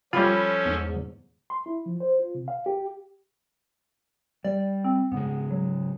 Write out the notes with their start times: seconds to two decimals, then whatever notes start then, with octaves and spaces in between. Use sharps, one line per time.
0.13 F3 G3 C#4 F4 A4 C#5 B5
0.65 E2 G#2
1.50 C6
1.66 E4
1.86 F3
2.00 C5
2.19 F4
2.35 C3
2.48 F5
2.66 G4
4.44 G3 D5
4.84 C4
5.12 G#2 C#3 G#3 B3
5.50 F#3